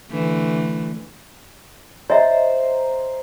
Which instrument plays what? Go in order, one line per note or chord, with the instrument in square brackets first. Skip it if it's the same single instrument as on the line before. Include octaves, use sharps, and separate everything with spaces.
[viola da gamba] D3 E3 A3
[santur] C5 A#5 [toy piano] C#5 D#5 E5